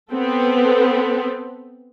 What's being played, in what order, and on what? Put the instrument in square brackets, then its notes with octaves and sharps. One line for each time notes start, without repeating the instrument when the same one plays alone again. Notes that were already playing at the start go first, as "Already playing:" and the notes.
[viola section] B3 C4 A4